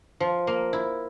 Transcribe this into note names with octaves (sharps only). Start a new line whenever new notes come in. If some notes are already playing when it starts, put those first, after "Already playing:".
F3
A#3
E4